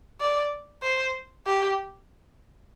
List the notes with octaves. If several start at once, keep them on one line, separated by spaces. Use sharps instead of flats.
D5
C5
G4